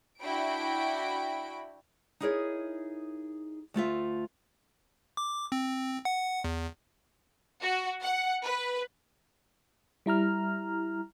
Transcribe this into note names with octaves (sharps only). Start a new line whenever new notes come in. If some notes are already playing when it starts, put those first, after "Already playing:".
D4 E4 F#4 G5 B5 D7
D#4 E4 G#4 A#4 C5 C#5
D2 A3 F4 E5
D6
C4
F#5
E2
F#4
F#5
B4
G3 E4 A#5 F6